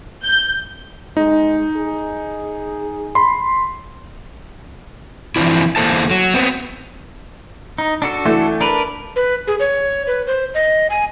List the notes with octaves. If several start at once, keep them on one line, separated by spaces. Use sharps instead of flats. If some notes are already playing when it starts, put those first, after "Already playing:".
G6
G#3 D#4
G#4
B5 C6
E3 F3 C4 D4 E4
E2 E3 A#3 A4 C5 A5
F#3
B3 C4
D#4
D4 F#4 A4
E3 A3
D4 A#4 B4
B4
G#4
C#5
B4
C5
D#5
G#5